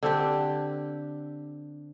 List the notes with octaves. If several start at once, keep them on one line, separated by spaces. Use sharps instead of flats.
D3 C4 D4 G4